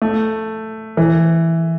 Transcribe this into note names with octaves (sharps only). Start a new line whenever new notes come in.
A3
E3